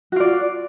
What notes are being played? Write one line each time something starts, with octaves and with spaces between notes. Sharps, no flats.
F4 F#4 D5